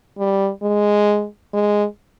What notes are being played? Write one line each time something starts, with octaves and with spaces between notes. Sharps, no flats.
G3
G#3
G#3